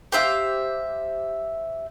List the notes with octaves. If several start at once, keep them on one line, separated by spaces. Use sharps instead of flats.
G4 C5 E5 F5